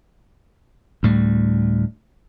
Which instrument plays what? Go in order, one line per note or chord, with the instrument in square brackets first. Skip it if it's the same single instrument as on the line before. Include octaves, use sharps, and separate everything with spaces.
[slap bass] D2 A2 G3